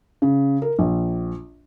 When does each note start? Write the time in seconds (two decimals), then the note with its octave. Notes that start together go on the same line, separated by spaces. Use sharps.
0.22 C#3
0.62 A#4
0.79 A#1